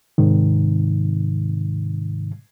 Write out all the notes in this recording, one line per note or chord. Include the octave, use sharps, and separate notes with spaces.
G#2 C3 D#3